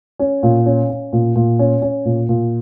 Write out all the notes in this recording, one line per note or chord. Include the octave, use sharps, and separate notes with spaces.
C#4
A#2
C#4
C#4
A#2
A#2
C#4
C#4
A#2
A#2